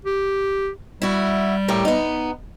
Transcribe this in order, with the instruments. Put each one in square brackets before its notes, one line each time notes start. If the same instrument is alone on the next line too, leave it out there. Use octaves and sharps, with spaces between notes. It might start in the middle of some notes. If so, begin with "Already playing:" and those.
[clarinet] G4
[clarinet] G3 [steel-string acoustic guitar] E4 F#4
[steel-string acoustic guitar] A2 G4 A#4
B3 D#4